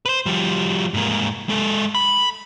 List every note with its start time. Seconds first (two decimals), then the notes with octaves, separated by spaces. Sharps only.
0.06 B4 C5
0.26 F3 G3
0.94 G#2 A#3
1.49 G#3 A4
1.95 B5